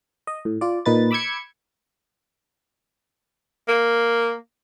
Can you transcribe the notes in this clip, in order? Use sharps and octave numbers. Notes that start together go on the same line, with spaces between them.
D#5
A2
F4 D5
A#2 D#4 B4 A6
B5 D6 E6 G6 G#6 C#7
A#3